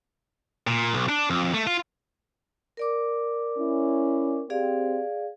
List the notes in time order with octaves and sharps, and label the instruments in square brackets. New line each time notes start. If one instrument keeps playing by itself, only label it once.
[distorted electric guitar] A#2
B1
D4
F2
A3
F4
[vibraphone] A#4 D5 D6
[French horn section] C#4 E4
[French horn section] C4 G4 [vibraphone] G#4 D5 F5